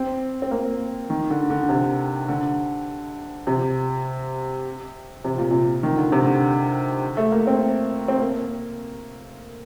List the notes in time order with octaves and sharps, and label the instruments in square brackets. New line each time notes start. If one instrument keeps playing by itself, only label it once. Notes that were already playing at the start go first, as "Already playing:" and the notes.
Already playing: [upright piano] C4
C4
A#3
D#3
D3
D3
C3
D3
C3
C3
A#2
C3
D#3
D3
C3
D3
A3
A#3
C4
C4
A#3